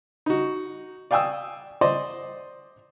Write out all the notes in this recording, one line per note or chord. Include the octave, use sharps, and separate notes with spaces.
D#4 F#4
D5 F5 G5 G#5 D#6 E6
C5 D5 D#5 C6